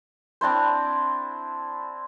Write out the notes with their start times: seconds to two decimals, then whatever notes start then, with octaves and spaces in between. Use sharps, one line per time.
0.41 C4 D4 E4 C5